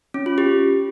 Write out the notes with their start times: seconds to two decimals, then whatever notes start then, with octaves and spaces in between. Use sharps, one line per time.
0.14 C#4
0.26 F4
0.38 G4